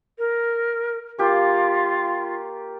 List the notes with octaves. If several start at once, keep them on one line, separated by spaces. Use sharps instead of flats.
A#4
A#3 F4 G4 C#5